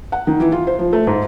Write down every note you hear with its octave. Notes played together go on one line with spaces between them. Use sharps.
F#5
D#3
E3
F4
C5
F3
A3
G#2